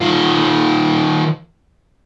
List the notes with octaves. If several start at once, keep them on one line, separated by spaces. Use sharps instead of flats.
D#3 F4